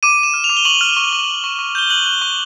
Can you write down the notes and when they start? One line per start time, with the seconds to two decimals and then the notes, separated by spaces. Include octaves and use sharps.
0.03 D6 D#7
0.19 D6 E7
0.34 F6
0.44 F7
0.49 D6
0.57 G7
0.65 C#6 F#7
0.81 F6
0.97 C#6
1.13 C#6
1.28 C#6
1.44 C#6
1.59 C#6
1.75 G6 G7
1.90 F#6 F#7
2.06 F#6 G7
2.22 C#6